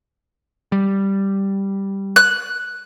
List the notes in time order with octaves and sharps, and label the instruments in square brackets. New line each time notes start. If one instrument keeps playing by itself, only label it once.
[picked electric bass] G3
[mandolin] F#6